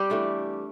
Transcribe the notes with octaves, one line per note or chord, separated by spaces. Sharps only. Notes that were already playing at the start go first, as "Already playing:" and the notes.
Already playing: G3 C4 G4
E3 A3 D4